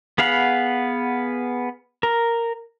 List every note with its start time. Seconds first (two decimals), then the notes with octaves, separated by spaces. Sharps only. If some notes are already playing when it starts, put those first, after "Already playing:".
0.18 B3 G#4 F5 F#5 B5
2.03 A#4